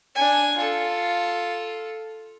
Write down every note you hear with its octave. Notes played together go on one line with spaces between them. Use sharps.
D4 G#5
F4 A4